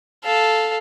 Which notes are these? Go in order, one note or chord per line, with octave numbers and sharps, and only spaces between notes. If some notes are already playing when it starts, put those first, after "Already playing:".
A4 F5